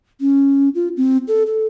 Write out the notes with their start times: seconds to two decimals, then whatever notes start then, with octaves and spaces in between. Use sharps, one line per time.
0.21 C#4
0.75 F4
0.97 C4
1.28 A4
1.46 A4